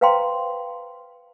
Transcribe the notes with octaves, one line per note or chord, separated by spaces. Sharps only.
B4 C5 F5 G5 A#5 C6